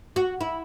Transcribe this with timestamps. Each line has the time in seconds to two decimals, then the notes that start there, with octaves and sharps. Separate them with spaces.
0.16 F#4
0.41 E4